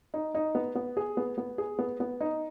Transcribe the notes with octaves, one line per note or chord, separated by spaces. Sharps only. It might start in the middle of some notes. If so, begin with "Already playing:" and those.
D#4
D#4
B3
B3
G#4
B3
B3
G#4
B3
B3
D#4